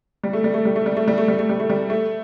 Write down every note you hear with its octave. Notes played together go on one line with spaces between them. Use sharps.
G3
A3
G3
A3
G3
A3
G3
A3
G3
A3
G3
A3
G3
A3
G3
A3